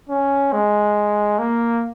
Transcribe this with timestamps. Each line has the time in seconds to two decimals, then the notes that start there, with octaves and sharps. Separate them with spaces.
0.09 C#4
0.53 G#3
1.39 A#3